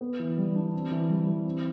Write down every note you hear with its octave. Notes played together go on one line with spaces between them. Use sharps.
B3
E3
G3
D4
C4
E3
G3
E3
C4